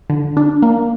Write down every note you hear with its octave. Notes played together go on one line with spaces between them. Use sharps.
D3
D4
A#3